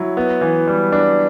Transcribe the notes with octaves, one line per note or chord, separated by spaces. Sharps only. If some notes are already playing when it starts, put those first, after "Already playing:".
Already playing: F#3 E4
B3
E3
G3
D4